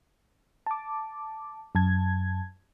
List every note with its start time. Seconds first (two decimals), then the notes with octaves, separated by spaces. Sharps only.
0.66 A5 D6
1.75 F#2 A5 G#6